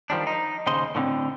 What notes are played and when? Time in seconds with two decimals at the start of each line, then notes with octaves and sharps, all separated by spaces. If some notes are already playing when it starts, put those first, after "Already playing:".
0.10 D#3 F3 G3 D4
0.27 D#4
0.67 D#2 C#3 C5 D#5 C6
0.95 A2 D3 A#3 C4